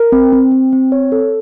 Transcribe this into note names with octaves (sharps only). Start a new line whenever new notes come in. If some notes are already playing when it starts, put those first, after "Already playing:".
Already playing: A#4
C4
C4
C4
C4
C#5
A4